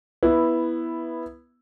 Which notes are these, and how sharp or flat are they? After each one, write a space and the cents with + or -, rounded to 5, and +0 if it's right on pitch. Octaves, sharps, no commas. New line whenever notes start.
B3 -5 E4 +0